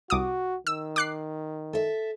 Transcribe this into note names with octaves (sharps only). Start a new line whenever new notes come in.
C2 F#4 D6 D#6
D#3 E6
D6 F#6 C7
A4 E5